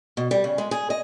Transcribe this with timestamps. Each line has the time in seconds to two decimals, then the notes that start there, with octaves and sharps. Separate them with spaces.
0.17 B2
0.31 G3
0.44 C#3
0.58 G#3
0.71 G#4
0.90 D#5